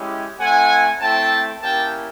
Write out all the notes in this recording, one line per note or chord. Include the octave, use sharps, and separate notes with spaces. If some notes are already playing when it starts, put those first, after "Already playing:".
Already playing: G#3 C#4 E4 G4
A3 C4 E4 F#5 G#5
A3 C4 E4 G5 A5
A#3 C#4 E4 G4 G5 A5